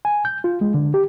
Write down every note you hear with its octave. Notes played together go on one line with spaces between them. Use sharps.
G#5
G6
F4
G#3
D3
G4